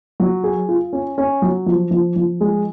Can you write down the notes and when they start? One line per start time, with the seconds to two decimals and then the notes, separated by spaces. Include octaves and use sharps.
0.20 F#3
0.44 G#4
0.69 F4
0.93 C#4
1.18 C#4
1.42 F#3
1.66 F3
1.91 F3
2.16 F3
2.41 G#3